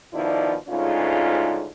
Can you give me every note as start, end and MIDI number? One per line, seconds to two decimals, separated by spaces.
0.14 0.55 47
0.14 0.55 51
0.14 0.55 53
0.14 0.55 64
0.14 0.55 74
0.68 1.69 38
0.68 1.69 44
0.68 1.69 49
0.68 1.69 61
0.68 1.69 65